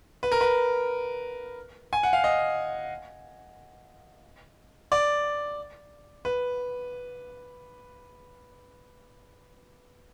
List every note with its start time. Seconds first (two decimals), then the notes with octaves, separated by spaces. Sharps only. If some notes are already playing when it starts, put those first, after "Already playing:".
0.23 B4
0.32 A#4
0.41 B4
1.93 G#5
2.03 F#5
2.13 F5
2.24 D#5
4.92 D5
6.25 B4